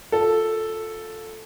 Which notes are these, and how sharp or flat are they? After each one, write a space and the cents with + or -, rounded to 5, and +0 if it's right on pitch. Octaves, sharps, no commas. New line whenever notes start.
F4 +25 A4 +0